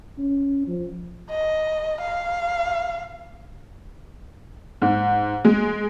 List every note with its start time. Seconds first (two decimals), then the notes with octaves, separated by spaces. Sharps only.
0.18 C#4
0.67 F3
1.30 D#5
2.01 F5
4.82 G#2
5.45 G#3